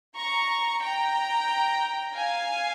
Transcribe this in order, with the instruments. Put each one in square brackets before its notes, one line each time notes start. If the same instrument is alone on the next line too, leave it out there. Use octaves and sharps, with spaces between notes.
[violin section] A#5 C#6
G5 A#5
F5 G#5